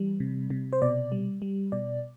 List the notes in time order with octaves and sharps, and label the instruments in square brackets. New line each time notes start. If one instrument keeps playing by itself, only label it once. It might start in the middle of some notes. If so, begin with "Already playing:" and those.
Already playing: [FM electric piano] E3 G3
C3
C3
C5
B2 D5
G3
G3
B2 D5